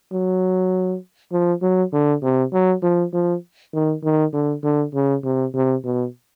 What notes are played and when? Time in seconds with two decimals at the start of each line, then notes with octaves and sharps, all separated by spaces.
0.12 F#3
1.32 F3
1.62 F#3
1.93 D3
2.23 C3
2.53 F#3
2.83 F3
3.13 F3
3.74 D#3
4.04 D#3
4.33 D3
4.63 D3
4.94 C#3
5.24 C3
5.54 C3
5.85 B2